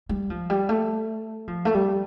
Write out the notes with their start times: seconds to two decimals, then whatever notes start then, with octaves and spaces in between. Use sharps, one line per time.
0.09 G3
0.30 F3
0.50 G3
0.69 A3
1.48 F3
1.65 A3
1.74 G3